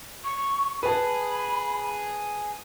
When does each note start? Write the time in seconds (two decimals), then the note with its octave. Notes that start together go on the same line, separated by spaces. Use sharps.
0.24 C#6
0.83 G#4 B4 A5 B5